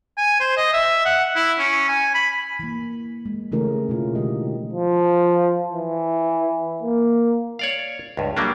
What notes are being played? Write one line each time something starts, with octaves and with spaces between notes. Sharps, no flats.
G#5
C5
D#5
E5
F#5
E4
C#4
G#5
B5
E3 A#3
G#3
C#3 E3 A3 C#4 G#4 A#4
B2 E4 F4
D3 D#3 G#3 G4 D#5
F3
E3
A#3
C#5 D5 F5
C#2 G2
F#3 G3 A#3 D4